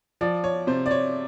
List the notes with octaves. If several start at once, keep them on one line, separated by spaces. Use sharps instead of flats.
F3 D5
C#5
C3 C5
D5
C#5